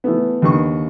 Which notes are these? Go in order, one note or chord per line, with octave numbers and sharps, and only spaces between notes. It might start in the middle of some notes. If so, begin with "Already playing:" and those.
E3 A3 B3
D#2 D3 B4 D#5 C#6